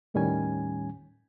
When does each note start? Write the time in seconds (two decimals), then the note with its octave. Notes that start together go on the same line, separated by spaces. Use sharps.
0.14 D#2 A2 D#3 G3 C#4 G#5